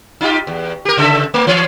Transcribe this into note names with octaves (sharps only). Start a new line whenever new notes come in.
D#4 F4 G4
E2
G4 A#4
C#3 A4 E5
A3
E3 C#5